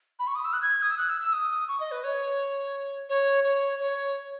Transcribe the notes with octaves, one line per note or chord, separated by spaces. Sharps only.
B5
C#6
D#6
E6
F#6
G#6
D#6
E6
F#6
E6
E6
D#6
C#6
D#5
B4
C#5
C#5
C#5
C#5